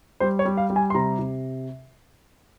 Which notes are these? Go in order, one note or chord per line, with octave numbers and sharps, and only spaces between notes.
G3 C5
C#5
G3
F5
G3
G#5
C6
C3 A#5
C3